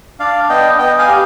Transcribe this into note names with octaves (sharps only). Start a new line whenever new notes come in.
D4 D5 F5
B3 D#5 G5
B3 D#5 G5
F5 G#5
G4